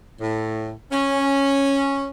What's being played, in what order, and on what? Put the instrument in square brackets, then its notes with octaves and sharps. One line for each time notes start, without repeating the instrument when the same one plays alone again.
[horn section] A2
C#4